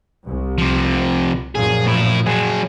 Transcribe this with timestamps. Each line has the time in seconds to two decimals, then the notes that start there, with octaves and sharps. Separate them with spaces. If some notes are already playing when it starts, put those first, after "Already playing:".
0.25 C2
0.58 C3 F3
1.55 F#2 A#2 F3 G#4
1.86 A2 E4
2.27 F#3 G#4